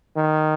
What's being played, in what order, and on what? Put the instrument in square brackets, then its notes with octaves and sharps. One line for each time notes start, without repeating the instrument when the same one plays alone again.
[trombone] D#3